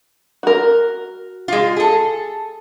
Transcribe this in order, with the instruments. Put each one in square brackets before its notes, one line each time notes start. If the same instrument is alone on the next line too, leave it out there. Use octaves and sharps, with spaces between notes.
[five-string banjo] F#4 A#4
[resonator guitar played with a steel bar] G#3 F4
G#4 A4